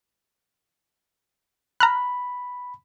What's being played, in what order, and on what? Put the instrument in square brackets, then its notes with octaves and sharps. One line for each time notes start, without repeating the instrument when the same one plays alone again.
[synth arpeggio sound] A#5 F6 F#6 [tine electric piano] B5